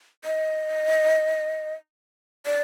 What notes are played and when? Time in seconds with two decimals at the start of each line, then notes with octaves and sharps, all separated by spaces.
0.25 D#5
2.46 D5